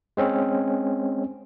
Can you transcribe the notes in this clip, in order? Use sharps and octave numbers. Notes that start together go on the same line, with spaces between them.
G#3 C4 C#4